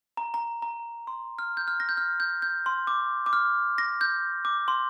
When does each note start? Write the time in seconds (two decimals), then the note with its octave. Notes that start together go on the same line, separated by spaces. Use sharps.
0.17 A#5
0.34 A#5
0.62 A#5
1.07 C6
1.39 F6
1.57 G6
1.68 F6
1.80 A#6
1.89 G6
1.97 F6
2.20 G6
2.42 G6
2.66 C6
2.87 D6
3.26 D6
3.33 F6
3.78 A#6
4.01 G6
4.45 D6
4.68 C6